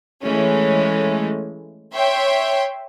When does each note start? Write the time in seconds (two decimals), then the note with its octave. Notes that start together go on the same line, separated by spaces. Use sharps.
0.23 E3 G#3 A3 C#4
1.92 C#5 E5 G5 C6